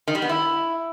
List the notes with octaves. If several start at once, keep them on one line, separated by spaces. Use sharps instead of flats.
D#3
G3
B3
E4